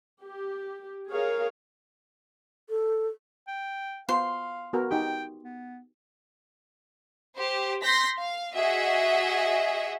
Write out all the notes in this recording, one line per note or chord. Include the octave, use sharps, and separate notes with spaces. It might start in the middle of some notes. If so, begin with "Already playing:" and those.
G4
G#4 A#4 C#5 F5
A4
G5
B3 F4 C5 F5 C6
B3 F#4 A#4
D#4 G4 G5
B3
G4 C5
C6 G6 A#6 B6
F5
F#4 G#4 D#5 E5 F#5